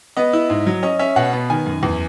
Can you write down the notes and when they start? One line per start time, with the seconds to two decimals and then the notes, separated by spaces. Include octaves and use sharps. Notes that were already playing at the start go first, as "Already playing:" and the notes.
0.17 B3 D#5
0.33 E4
0.50 G#2
0.67 F#3
0.83 C#4 D#5
0.99 C#4 E5
1.16 B2 F#5
1.33 B3
1.50 D#3 G#5
1.66 F#2
1.83 E2